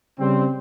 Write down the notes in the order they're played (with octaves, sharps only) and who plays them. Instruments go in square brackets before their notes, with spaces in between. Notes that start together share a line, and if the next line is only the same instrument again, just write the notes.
[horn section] C#3 G3 C4